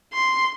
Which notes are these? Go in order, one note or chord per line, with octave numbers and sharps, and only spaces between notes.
C6